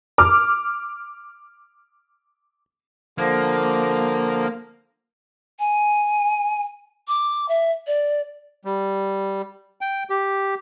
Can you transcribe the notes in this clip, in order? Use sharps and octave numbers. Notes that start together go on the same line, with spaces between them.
D6 F6
D3 F3 A#3
G#5
D6
E5
D5
G3
G5
G4